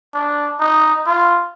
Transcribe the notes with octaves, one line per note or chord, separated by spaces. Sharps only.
D4
D#4
F4